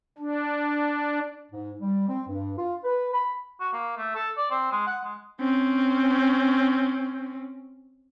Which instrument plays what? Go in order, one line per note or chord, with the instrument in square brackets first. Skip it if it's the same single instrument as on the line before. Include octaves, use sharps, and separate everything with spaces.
[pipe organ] D4
[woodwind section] G#2
G3
C4
G2
F4
B4
B5
[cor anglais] F#4
A#3
A3
A4
D5
C4
G#3
F#5
G#3
[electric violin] C4 C#4